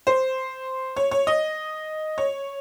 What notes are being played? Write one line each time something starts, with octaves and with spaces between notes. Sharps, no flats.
C5
C#5
C#5
D#5
C#5